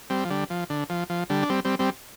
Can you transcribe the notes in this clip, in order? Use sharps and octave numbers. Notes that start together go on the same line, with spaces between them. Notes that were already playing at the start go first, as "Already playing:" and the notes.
G3 C4
F3
D3 G3
F3
D3
F3
F3
D3 G3
D4
G3 C4
G3 C4
G3 C4